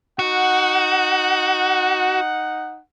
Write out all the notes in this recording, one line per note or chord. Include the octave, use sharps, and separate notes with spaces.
D#4 F#4 F#5